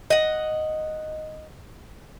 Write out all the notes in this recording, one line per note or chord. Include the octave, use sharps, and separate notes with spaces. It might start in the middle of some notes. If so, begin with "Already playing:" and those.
D#5 F#5